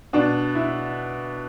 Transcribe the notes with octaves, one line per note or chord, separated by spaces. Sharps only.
B2 D4
E4